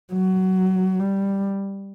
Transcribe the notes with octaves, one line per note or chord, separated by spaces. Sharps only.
F#3
G3